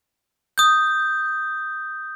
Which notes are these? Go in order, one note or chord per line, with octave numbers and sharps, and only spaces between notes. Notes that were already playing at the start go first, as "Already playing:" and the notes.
D#6 G6